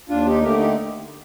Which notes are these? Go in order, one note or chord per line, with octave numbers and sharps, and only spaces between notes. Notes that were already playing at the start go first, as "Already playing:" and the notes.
D#2 D4 F4
D#4 G4
D3 A3 G4 A#4
D#4 G4